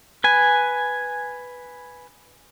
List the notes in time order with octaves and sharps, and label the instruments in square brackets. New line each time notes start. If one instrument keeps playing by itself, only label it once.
[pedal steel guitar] B4 G#5